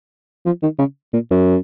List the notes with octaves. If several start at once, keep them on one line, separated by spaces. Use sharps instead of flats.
F3
D#3
C#3
A#2
F#2